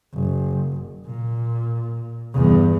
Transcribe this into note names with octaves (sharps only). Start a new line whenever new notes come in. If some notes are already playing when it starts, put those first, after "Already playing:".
F#1
A#2
E2 G2